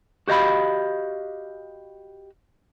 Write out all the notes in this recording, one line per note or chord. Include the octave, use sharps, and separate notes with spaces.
F#4 G4 D#5 F5 B5